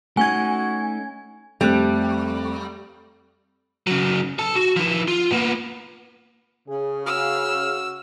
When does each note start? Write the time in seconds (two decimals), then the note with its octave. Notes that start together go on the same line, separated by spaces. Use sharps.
0.17 A3 C#4 D#4 F#4 G#5 G#6
1.61 F2 G3 A3 C4 F#6
3.87 C#3 F#3
4.39 A4 A5
4.55 F#4
4.76 F3 E4
5.08 F4
5.31 A#3 B3
6.68 C#3 G#4
7.06 F#4 E6 F6